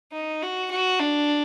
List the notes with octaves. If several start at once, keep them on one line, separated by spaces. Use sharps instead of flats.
D#4
F#4
F#4
D4